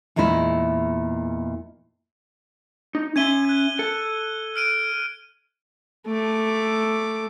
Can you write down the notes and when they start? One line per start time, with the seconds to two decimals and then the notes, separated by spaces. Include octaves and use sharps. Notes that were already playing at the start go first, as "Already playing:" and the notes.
0.16 E2 A#2 G#3 D#4 E4
2.95 D#4
3.16 C#4 E5 G#6 D#7 G7
3.45 F#6 G#6
3.79 A4
4.56 F6 D7 D#7
6.07 A3 D6